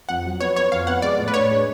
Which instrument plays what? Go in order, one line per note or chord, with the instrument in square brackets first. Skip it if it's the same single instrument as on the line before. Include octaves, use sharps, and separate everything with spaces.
[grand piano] F2 [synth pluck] F#5
[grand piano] F#3
[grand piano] B3 [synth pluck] C#5
[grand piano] B3 [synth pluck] C#5
[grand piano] F2 [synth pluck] F5
[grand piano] B3 [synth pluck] F#5
[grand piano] G#3 [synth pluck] D5
[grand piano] A2
[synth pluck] B4
[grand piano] D4 [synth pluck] C#5
[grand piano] G#3